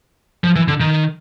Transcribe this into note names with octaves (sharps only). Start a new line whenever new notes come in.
F3
E3
D3
D#3